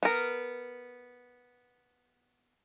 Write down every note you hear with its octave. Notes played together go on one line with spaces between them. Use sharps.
B3 A#4